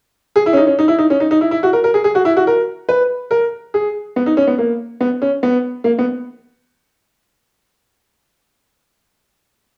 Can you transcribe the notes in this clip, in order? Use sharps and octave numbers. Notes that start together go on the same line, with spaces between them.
G#4
E4
C#4
D#4
C#4
D#4
E4
D#4
C#4
D#4
D#4
E4
E4
F#4
A#4
A#4
G#4
G#4
F#4
E4
F#4
A#4
B4
A#4
G#4
B3
D#4
C#4
B3
A#3
B3
C#4
B3
A#3
B3